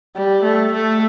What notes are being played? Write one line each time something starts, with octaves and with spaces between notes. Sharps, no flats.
G3
A3
A3